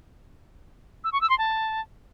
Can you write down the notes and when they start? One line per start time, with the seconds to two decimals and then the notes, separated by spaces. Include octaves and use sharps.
1.04 E6
1.13 C#6
1.21 E6
1.30 C6
1.38 A5